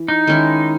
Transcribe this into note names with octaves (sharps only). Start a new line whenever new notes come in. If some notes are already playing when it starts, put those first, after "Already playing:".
Already playing: E3
D#4
D#3 G#3 C#4 E4